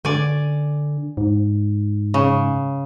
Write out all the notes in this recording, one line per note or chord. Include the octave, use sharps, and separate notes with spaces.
D3 D5 G#5
G#2
C#3